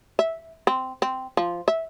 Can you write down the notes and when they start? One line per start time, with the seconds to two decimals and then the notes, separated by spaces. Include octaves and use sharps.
0.19 E5
0.67 C4
1.02 C4
1.37 F3
1.68 E5